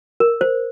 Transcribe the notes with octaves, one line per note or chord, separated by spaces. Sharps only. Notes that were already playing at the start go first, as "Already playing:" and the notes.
A#4
C5